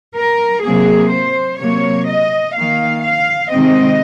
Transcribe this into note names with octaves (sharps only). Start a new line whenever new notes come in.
A#4
C3 F#3 A#3 G#4
C5
C3 F#3 A#3 C#5
D#5
D#3 A#3 F5
F5
C3 D#3 G#3 C4 D#5